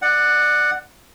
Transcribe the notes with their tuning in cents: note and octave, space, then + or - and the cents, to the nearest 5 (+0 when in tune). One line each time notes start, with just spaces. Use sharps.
D5 +25 F#5 +0